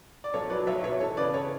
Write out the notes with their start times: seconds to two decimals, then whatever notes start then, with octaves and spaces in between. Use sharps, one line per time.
0.24 D5
0.34 B1 A4 C#5
0.50 F#3 B4 D5
0.67 B1 C#5 E5
0.84 B2 C#5 E5
1.00 E3 A4 C#5
1.17 C#3 B4 D5
1.34 A4 C#5